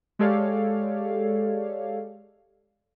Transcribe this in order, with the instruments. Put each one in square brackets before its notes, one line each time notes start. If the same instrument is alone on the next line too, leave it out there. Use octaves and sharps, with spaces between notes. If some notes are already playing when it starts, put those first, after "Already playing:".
[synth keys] G#3 G4 A4 C#5 D5 F5